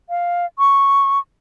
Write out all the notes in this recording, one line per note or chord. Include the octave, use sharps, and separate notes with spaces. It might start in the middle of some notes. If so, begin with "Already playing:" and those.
F5
C#6